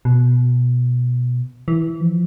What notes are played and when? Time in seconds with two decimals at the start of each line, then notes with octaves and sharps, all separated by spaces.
0.05 B2
1.68 E3
2.01 F3